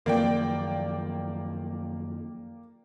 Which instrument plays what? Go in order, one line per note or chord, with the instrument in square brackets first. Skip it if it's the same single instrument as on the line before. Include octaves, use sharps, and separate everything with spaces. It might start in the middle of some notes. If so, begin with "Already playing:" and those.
[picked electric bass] F#2 D#3 F3 [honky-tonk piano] A#3 D5 G5